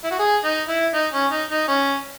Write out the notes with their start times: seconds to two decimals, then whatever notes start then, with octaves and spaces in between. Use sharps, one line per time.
0.04 E4
0.11 F#4
0.19 G#4
0.45 D#4
0.69 E4
0.94 D#4
1.13 C#4
1.31 D#4
1.51 D#4
1.68 C#4